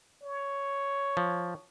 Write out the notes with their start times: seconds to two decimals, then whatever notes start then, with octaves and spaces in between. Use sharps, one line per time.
0.24 C#5
1.17 F3